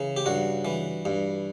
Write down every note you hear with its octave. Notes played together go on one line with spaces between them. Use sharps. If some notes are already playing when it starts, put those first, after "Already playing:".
Already playing: C#3 E3
G4
G2 F#4
E3
G2